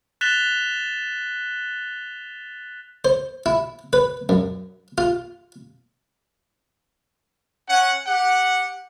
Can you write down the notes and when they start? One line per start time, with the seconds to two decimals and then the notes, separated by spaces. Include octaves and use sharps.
0.21 F#6 A6 B6 E7 F7 G7
3.05 C5
3.46 E4
3.93 B4
4.29 F#2
4.98 F4
7.68 C#4 F#5
8.07 G4 F#5